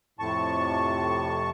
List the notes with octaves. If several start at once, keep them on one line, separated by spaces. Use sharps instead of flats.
F2 A2 C3 A5 C#6